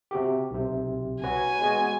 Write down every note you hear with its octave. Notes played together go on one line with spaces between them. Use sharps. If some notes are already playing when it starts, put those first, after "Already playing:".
C3 F#4 G4
B1 C3
F#4 B4 C#5 G#5
G#3 B3 F#4